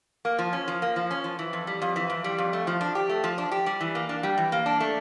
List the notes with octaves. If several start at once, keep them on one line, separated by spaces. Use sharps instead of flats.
A#3
F3
C#4
F3
A#3
F3
C#4
F3
E3
F2
G3
F2
E3
F2
G3
F2
A3
F3
D4
G4
A3
F3
D4
G4
G3
E3
A#3
D4
G3
E3
A#3
D4
A3